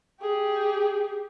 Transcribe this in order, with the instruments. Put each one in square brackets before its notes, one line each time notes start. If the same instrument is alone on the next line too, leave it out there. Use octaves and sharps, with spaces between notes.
[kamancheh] G4 G#4